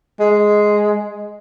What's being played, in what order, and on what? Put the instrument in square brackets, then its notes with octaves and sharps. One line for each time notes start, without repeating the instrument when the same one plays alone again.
[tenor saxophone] G#3